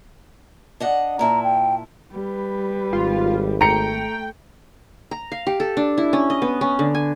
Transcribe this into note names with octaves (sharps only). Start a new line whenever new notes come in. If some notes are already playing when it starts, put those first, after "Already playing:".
D4 D#5 F#5
A#2 E4 A5 A#5
G5
G3 B4
G#1 F4
A3 G5 A#5 C#7
A#5
F5
G4
A4
D4
E4
C#4
D#5
B3
C#4
D3
G#5